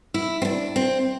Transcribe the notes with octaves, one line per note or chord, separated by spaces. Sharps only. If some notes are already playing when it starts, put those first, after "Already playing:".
E4
C4
D4
C4